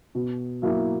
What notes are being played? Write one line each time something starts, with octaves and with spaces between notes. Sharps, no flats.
B2
F#3 A#3 E4